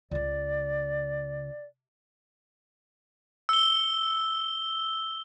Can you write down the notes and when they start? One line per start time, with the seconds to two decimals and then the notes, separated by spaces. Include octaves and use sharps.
0.11 C#2 C#3 D5
3.49 E6 G7